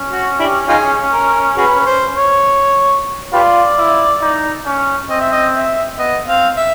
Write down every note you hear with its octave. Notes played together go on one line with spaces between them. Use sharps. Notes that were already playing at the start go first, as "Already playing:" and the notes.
Already playing: C#4
F#4
D4 E4 G4
D#4 F4 G#4
A#4
F#4 G#4 B4
B4
C5
C#5
F4 G4 B4 D5
E4
D#4
C#4
C4 D#5
E5
D#5
E5
B3 D#5
C4 F5
E5